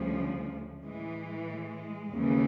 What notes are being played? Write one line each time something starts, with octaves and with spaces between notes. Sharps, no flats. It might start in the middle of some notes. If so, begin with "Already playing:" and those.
Already playing: D2 C#3 F3 G3
A2 E3 G#3
G#3
D#2 C#3 E3